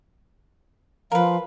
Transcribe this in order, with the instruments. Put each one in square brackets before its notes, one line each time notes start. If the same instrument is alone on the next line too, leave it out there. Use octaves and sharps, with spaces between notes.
[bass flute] F3 [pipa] A#4 B4 [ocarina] F5